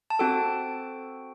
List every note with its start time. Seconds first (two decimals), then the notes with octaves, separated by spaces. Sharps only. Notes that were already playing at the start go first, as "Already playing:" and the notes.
0.10 A5
0.19 C4 F#4 A4 G5